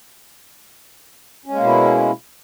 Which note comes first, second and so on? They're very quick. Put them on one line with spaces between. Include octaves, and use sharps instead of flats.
C#4 G#3 A#3 B2 E4